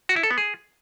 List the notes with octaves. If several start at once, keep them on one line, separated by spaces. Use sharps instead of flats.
F#4
E4
A4
B3
G#4